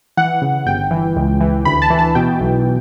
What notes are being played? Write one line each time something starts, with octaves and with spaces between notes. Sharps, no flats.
E3 F#5
C#3
G1 G5
E3
C#2
E3
D2 B5
A5
E3
A5
B2 G5
B1